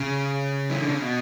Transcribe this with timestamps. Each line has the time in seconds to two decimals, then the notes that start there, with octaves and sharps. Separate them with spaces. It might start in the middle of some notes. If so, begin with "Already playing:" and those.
Already playing: C#3
0.70 E3
0.82 D3
0.91 C#3
1.02 B2